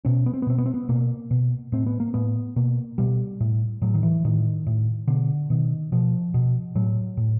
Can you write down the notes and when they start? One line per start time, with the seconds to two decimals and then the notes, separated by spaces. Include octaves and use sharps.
0.05 B2 C#4
0.26 B3
0.34 C4
0.42 B3
0.47 B2 C4
0.58 B3
0.66 C4
0.74 B3
0.89 B2 A#3
1.31 B2
1.72 A2 C4
1.86 B3
2.00 A#3
2.14 A2 B3
2.56 B2 A#3
2.98 B2 G3
3.41 A2
3.82 A2 F#3
3.94 D#3
4.03 E3
4.25 A2 D#3
4.67 A2
5.08 B2 D3
5.50 B2 D#3
5.92 B2 F3
6.34 B2
6.75 A2 F#3
7.17 A2